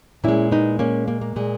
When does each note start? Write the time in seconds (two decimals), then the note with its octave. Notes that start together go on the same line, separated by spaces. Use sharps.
0.24 A#2 G#3 C#4 E4
0.51 B3 D#4
0.79 A#3 C#4
1.08 A#3
1.21 A#3
1.36 A#2 G#3